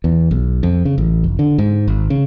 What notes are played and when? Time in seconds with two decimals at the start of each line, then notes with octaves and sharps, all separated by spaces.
0.04 E2
0.31 B1
0.63 F2
0.85 C#3
0.98 A1
1.24 F1
1.39 D3
1.58 G#2
1.87 G#1
2.10 C#3